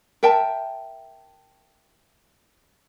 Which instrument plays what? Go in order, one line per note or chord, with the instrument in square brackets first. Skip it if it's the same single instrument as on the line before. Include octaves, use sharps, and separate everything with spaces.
[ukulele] A#4 E5 G5 A5